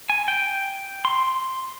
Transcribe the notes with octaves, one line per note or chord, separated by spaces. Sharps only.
G#5
G5
C6